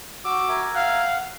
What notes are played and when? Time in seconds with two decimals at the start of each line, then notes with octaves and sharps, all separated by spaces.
0.25 F#4 D6 E6
0.48 A#4 E5 G#5
0.74 F5 F#5